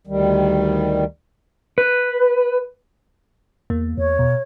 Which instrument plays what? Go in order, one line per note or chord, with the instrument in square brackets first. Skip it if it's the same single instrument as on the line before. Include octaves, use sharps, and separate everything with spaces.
[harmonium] D2 D#3 G3
[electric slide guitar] B4
[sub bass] E2 [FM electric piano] A#3
[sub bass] E2 [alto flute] C#5
[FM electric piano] B2